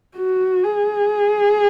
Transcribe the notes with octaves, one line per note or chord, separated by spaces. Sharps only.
F#4
G#4